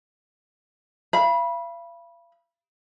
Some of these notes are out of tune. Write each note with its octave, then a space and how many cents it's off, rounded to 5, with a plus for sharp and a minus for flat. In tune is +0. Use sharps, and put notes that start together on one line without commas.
F5 -40 B5 -20